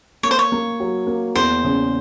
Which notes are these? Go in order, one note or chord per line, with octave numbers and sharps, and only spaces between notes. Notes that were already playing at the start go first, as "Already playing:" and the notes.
A#3 C#5
C5
C#5
A#3
F#3
A#3
E2 C5
C#3